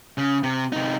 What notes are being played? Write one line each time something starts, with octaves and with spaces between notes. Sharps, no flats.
C#3
C3
C3 D#4